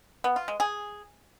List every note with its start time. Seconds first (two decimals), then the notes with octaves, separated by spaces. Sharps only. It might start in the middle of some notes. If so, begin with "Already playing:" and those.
0.24 B3
0.36 F4
0.48 G#3
0.60 G#4